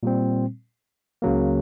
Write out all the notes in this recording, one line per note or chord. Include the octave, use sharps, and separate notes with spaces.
A#2 G3 C4
C#2 C#3 F#3 A#3